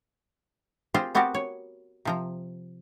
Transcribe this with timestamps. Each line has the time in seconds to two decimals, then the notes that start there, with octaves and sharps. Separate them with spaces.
0.94 C4 F4 G4 G#4 C5
1.15 B3 C4 F#4 G4 A#4 A5
1.34 C#5
2.05 C3 F3 A#5